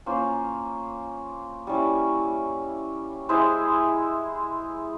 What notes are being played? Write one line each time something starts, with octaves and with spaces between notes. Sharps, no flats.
A#3 C#4 F4 C5
G3 C#4 E4
G#3 E4 G#4 C5